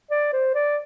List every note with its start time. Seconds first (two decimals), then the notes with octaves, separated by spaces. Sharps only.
0.11 D5
0.33 C5
0.55 D5